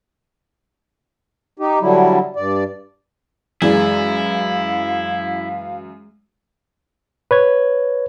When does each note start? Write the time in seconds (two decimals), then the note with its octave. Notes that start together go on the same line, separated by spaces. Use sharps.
1.59 D#4 G4
1.81 D3 F#3 G3 E4
2.36 G2 D5
3.62 F#2 E3 G#3 E4 G#4 D5 F5
7.31 B4 C#5 G#6